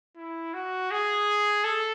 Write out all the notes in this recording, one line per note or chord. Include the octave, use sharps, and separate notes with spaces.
E4
F#4
G#4
A4